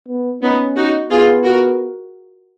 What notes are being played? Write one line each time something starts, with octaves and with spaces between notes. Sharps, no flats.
B3
B3 C#4 D#4
D#4 F#4
B3 F4 G#4
F#4 A#4